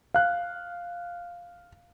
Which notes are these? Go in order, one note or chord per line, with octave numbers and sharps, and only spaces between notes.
F5 F#6